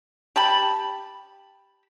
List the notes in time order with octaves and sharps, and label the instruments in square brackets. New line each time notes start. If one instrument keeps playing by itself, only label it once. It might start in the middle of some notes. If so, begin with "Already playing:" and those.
[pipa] G4 A5 B5